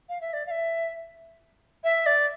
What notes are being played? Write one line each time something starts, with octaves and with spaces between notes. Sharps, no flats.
F5
E5
D5
F5
E5
E5
D5